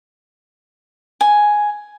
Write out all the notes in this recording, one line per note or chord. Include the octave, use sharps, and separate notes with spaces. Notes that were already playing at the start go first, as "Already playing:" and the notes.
G#5